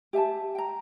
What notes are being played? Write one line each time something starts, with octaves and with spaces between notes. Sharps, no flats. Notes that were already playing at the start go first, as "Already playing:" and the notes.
G4 E5 G#5 A5
G5 A#5